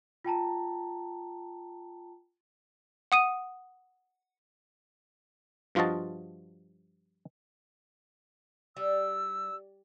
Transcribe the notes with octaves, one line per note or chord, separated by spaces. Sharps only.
F4 G5 A5 A#5
F#5 D#6 D#7
G2 F3 F4 F#4 D#5 A5
G3 E6